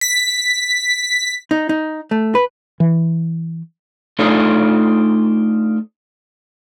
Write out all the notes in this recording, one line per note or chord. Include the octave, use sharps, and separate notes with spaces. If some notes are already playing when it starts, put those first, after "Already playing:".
B6
D#4
D#4
A3
B4
E3
A3 D4 D#4 F4 A4 C5